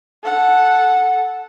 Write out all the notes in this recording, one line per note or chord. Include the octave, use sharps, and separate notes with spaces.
A4 F#5